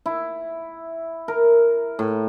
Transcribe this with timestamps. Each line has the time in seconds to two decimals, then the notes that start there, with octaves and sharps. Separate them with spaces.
0.06 E4
1.28 A#4
1.99 A2